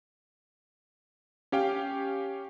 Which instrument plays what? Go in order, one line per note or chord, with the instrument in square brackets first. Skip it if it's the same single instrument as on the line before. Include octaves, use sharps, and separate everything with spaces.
[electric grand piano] C#4 G4 F5 G5